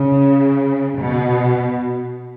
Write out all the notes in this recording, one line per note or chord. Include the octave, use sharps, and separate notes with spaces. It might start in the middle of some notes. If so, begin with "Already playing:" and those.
Already playing: C#3
B2